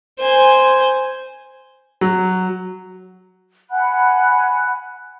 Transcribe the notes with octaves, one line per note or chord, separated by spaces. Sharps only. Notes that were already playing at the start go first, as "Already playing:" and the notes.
C5 G#5
F#3
F#5 G#5 B5 F#6